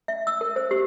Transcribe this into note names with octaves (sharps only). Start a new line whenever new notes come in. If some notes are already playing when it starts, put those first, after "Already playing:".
E5
E6
A#4
C5
G4